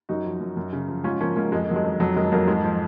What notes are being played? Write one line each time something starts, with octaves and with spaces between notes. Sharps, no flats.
F#2 D#4 F#4
F3
F#2
F#2
C#3
F3
G#2 C#4 F4
F3 A#3 C#4
G#2 A#3 C#4
F2 G#3
D#3 F#3
G#3
F2
F2 F#3
D#3 G#3
F2 F#3 A#3
G#2 G#3
F3